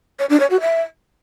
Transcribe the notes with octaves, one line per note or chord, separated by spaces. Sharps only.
C#5
D4
C#5
F#4
E5